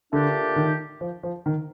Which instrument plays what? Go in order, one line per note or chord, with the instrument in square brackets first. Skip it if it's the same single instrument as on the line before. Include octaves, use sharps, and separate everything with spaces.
[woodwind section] A#2 A3 D4 G4 [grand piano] D3
[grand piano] D#3
F3
F3
D#3